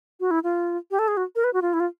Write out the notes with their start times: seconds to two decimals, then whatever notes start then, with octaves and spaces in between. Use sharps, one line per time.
0.20 F#4
0.31 E4
0.44 F4
0.91 G4
0.99 A4
1.08 G#4
1.17 F#4
1.35 A#4
1.44 B4
1.53 F#4
1.62 F4
1.73 E4
1.80 F4